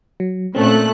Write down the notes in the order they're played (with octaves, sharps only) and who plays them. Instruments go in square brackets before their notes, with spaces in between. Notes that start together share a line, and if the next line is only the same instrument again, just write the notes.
[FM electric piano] F#3
[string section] A#2 A3 F#6 [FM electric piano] C4 C#4